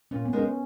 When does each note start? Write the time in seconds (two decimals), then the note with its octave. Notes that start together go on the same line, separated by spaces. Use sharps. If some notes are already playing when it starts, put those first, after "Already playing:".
0.11 A#2 C#4
0.25 B3
0.33 G#3 D#4 A#4
0.39 C#4